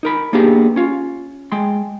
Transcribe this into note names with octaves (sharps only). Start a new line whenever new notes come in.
D#4 A#4 B5
A#3 B3 D4 G4 G#4
C#4 F4
G#3 G5 C6